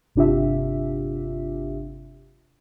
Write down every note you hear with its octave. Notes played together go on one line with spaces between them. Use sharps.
G1 C3 D4 F4 G4 E5